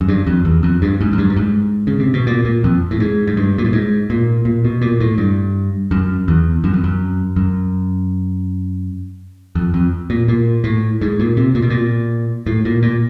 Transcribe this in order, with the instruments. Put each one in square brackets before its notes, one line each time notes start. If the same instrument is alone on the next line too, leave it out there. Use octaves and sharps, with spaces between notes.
[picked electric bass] F#2
G2
F2
E2
F2
G2
G#2
F#2
G2
G2
G#2
C#3
C3
B2
A#2
A#2
F2
A2
G#2
G#2
G2
A#2
A2
G#2
A#2
A#2
B2
A#2
A2
G2
F#2
E2
F#2
F2
F#2
F#2
F2
F2
A#2
A#2
A2
G#2
A#2
C3
A#2
B2
A#2
A2
A#2
A#2